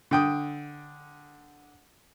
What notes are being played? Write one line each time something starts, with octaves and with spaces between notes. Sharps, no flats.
D3 G5 D#6